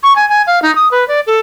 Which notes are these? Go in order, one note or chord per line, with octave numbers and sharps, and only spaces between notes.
C#6
G#5
G#5
F5
D#4
D#6
B4
D5
A4